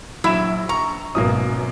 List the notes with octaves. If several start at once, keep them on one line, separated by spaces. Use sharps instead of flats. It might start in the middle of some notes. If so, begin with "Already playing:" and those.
A#1 F#3 E4 E5 E6 E7
A#5 C#6
G#1 F#2 B2 F#3 A#3 D#6